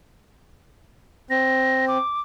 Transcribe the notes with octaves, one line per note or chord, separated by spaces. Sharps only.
C4 A#6
D6